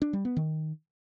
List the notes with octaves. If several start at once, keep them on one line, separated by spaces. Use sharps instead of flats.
D4
G3
B3
D#3